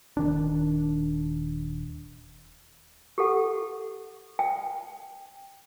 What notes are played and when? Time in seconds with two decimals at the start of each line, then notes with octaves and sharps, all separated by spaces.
0.17 D#1 D#3 D4
3.18 G4 A4 F#5
4.39 G5